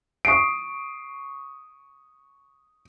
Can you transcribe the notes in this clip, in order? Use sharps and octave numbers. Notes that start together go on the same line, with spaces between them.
C#6 D#6 C7 D7